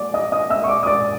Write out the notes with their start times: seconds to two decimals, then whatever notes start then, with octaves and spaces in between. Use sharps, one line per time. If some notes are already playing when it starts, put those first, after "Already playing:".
Already playing: D5 D6
0.14 D#5 D#6
0.32 D#5 D#6
0.50 E5 E6
0.64 C#6
0.68 D5 D6
0.83 D#6
0.86 D5 D6